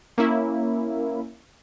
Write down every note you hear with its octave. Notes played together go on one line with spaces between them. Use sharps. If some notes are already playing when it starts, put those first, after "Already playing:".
A#3 C#4 E4